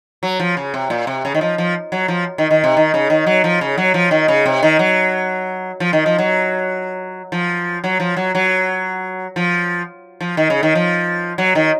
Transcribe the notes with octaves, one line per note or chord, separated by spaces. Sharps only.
F#3
F3
C#3
C3
A#2
C3
C#3
D#3
F3
F3
F#3
F3
D#3
D#3
C3
D#3
C#3
D#3
F#3
F3
C#3
F#3
F3
D#3
C#3
C3
D#3
F#3
F3
D#3
F3
F#3
F3
F#3
F3
F#3
F#3
F3
F3
D#3
C#3
D#3
F3
F#3
D#3